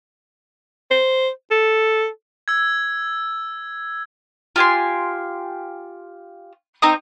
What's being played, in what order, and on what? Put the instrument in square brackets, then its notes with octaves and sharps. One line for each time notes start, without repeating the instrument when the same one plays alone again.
[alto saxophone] C5
A4
[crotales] E6 G#6
[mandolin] F4 G4 G#5 C6
C4 D#4 A#5 D#6